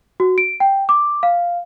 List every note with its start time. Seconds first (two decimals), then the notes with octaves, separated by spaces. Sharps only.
0.20 F#4
0.38 D7
0.60 G5
0.89 D6
1.23 F5